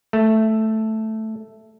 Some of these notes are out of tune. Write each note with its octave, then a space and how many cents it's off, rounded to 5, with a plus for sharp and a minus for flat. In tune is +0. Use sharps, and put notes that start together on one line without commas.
A3 +0